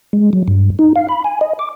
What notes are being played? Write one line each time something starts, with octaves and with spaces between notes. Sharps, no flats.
G#3
F#3
G2
D#4
F5
B5
G#5
D#5
D6